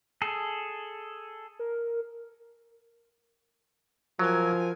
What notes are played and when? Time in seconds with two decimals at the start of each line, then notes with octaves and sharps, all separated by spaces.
0.22 G#4 A4
1.59 A#4
4.19 F3 F#3 A#4 G#5